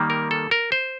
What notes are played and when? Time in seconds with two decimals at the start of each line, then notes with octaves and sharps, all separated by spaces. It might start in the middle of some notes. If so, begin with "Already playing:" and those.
Already playing: D#3 G3 A#3
0.10 A#4
0.31 A4
0.51 A#4
0.72 C5